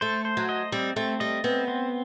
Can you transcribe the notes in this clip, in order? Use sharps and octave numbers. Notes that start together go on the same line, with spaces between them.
A3 C5
C5
F#3
D#5
G3 C4
A3 C4
G3 D#5
B3 C4
C4